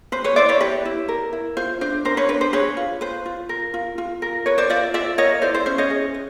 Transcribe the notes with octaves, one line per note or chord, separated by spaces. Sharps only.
B4 C5
B4 C#5
E4 C5 D5
B4 C#5
G4 B4
E4
A#4
E4
F4 C5
D4 C5
A#4 C5
B4 C#5
D4 B4
C5
G#4 B4 C#5
F4
B4 C5
F4
A#4
F4
F4
A#4
A#4 B4 C#5
C5 D5
F4 D5 E5
F4 D5 E5
A#4 C#5 D#5
E4 C5 D5
C5
C#4 C5
C#5 D#5
G#4
B4